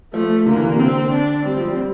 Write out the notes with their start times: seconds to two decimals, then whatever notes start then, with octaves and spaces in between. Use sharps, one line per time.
0.13 F3 A3
0.46 D3 A#3
0.56 E3
0.65 D3
0.74 C3
0.79 D3 C4
1.12 D4
1.45 G3 C4
1.57 F3
1.67 G3
1.79 G3